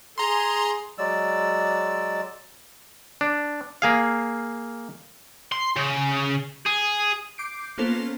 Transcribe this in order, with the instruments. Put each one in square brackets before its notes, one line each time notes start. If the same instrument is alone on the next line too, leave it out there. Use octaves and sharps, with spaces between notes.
[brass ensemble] G#4 [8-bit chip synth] A#5 C6
[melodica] F#3 G#3 D5 E6
[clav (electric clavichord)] D4
A#3 G#4 F5
[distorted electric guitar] C6
C#3
G#4
[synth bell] D6 G6 C7 D7
A#3 B3 C#4 F4 A4 C5